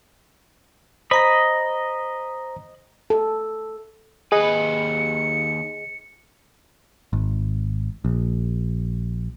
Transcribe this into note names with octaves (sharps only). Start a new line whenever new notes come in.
C5 D#5 A#5 B5 A#6
A4
D#2 G#4 B4 D#5 C#7
G#1
A#1